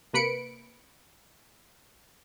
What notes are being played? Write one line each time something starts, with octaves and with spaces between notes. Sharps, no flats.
C3 A#3 B4 B5 C#7 D7